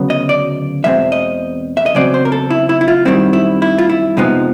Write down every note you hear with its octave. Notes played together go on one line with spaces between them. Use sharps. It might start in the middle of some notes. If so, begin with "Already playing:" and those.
Already playing: D2 C#3 F#3 B3
D#5
D5
E2 B2 G#3 C4 E5
D#5
E5
D#5
E2 C#3 F#3 C4 D5
C5
A#4
A4
E4
E4
E4
F4
F#2 D#3 G3 C4 E4
E4
E4
F4
E4
F2 C3 F3 G#3 B3 D#4